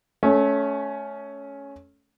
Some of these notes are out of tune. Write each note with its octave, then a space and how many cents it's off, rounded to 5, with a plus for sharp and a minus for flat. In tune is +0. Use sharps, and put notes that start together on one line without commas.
A3 -20 C#4 +10